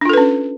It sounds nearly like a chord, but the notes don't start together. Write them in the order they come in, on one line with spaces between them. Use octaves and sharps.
D4 F4 A4 B4 C#4